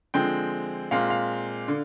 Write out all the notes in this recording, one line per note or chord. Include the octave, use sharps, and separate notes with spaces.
D3 F3 G#3 C4 G5
A#2 G#3 C4 F5
F5
D3